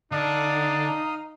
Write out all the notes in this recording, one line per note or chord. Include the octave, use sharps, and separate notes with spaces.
D3 D4 D#4 F5 D#6